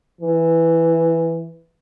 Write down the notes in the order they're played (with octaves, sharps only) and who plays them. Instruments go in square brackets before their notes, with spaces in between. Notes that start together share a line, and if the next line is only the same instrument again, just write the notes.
[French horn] E3